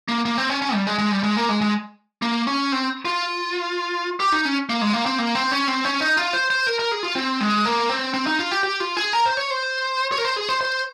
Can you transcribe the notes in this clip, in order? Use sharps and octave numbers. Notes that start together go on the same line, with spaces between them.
A#3
A#3
C4
C#4
C#4
G3
G#3
G#3
G3
G#3
A#3
G#3
G#3
A#3
C#4
C4
F4
G4
D#4
C#4
A#3
G#3
A#3
C4
A#3
C4
C#4
C4
C#4
D#4
F4
C5
C5
A#4
A#4
G#4
F4
C4
G#3
A#3
C4
C4
D#4
F4
G4
G4
F4
G#4
A#4
C5
C#5
C5
C#5
A#4
C5
G#4
C5
C5